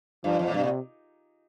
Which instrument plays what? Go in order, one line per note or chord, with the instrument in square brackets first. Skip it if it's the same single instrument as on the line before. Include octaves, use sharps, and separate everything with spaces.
[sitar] G2 [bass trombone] F3
[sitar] F2
A#2
[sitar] G2 [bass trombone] C3
[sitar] A#2